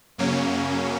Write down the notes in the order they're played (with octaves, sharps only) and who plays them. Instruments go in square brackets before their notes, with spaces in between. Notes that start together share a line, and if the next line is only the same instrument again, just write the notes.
[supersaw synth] F#2 C#3 F#3 A#3 C#4